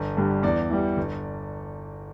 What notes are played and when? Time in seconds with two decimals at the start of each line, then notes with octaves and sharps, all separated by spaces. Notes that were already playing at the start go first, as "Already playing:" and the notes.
Already playing: G1
0.17 G2 D3 G3
0.43 E2 D5
0.70 E3 G3
0.97 G1